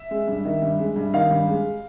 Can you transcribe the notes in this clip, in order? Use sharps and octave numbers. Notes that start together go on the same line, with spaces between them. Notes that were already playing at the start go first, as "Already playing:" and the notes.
Already playing: E5
G#3
G2
D#3
G2
G#3
G2
D#3 F5
G2
G#3